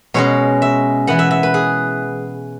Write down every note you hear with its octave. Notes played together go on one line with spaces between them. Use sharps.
B2 G#3 C#4 C#5
E5
E3 B3 F#5
E5
E5
B4
G#4